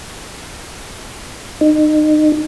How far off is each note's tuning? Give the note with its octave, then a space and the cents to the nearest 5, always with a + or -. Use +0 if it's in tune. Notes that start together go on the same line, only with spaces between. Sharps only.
D#4 -30